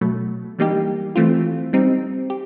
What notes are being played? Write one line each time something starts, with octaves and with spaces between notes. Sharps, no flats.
B2 F#3 A3
E3 G3 A#3 D#4 G4
E3 A3 C4 F4
G3 C4 D#4
G4